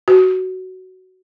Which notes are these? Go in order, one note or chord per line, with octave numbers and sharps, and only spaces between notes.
F#4